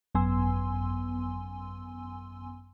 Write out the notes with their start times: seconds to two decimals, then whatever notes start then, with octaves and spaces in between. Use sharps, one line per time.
0.15 G#1 F#2 B3 G#5 C6 E6